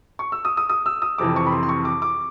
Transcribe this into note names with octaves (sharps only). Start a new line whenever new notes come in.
C#6
E6
D#6
D#6
D#6
E6
D#6
F2 C3 E3 D6
C#6
B5
C6
C6
C#6
D6
D6